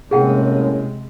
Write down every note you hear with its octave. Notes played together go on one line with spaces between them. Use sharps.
A2 C3 G#3 A#3 C#4 G#4 F#5 G5